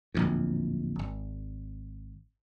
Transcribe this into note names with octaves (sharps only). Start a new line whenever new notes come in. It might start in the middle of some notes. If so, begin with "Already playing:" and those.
D1 A#1 E2
G#1